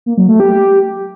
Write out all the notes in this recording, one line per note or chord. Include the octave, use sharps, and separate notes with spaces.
A#3
F#3
A3
G4